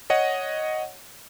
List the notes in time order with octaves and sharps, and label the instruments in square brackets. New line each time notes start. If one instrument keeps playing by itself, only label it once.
[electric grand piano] C#5 D#5 F#5